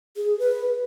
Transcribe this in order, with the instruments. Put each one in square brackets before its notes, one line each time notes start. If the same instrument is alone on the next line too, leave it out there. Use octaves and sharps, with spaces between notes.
[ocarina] G#4
B4